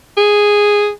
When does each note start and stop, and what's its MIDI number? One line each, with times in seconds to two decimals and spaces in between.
0.17 0.90 68